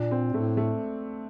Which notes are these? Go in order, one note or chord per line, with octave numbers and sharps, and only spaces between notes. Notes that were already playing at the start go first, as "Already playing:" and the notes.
Already playing: A#2 D4
C4
A2 A3
A3